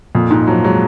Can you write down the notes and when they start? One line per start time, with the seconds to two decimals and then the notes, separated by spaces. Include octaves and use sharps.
0.15 F2 A#2
0.30 G#2 D#4
0.47 F3 F#3
0.64 F#3 G#3